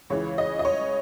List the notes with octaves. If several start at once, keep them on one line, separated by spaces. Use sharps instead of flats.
C#2 C#3 E3 C#5
D#5
D#5
C#5